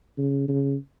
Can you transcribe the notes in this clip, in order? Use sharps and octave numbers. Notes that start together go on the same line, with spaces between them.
C#3
C#3